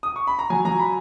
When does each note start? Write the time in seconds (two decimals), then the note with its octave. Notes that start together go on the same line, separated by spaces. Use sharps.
0.03 D#6
0.16 C#6
0.27 B5
0.39 A#5
0.50 F#3 G#5
0.65 F#3 A#5
0.79 B5